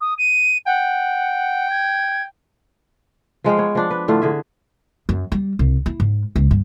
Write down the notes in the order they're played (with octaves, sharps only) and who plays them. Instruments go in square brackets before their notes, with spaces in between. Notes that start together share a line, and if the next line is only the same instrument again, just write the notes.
[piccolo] D#6
D#7
[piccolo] F#5 [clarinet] G5
[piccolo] G#6
[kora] F3 G#3 F5 G5
B3 C#5
F3 D4
B4
A2 D3 A3 F4
D3 G#4 E5
[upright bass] F#2
G3
C2
E4
G#2
C#2
G2